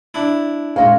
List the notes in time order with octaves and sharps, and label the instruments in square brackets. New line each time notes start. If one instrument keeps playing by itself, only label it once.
[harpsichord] D4 E4
[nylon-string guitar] A#2 G#3 C#4 [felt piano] F5